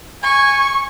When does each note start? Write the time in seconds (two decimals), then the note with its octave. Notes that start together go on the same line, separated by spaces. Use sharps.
0.23 G#5 C#6